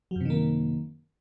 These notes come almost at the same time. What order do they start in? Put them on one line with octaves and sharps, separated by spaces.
F#3 F#2 C3 D#3 A#3